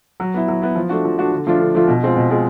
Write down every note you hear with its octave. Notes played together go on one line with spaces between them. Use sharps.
F#3
B3 E4
F#3
B3 E4
F3
A3 D4 F#4
F3
A3 D4 F#4
D3
F3 A3 D4 F4
D3
F3 A3 D4 F4
B2
G#3 C4 F4
B2
G#3 C4 F4